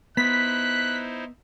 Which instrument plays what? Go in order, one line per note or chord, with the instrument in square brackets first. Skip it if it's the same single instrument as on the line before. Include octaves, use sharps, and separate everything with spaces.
[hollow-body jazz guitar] B3 [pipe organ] D#4 E4 C5 [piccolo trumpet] F#6 [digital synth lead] B6